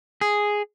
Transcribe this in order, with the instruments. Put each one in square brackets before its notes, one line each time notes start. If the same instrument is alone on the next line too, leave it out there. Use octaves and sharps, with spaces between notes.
[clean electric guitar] G#4